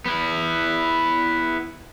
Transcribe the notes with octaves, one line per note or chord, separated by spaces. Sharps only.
B3 E4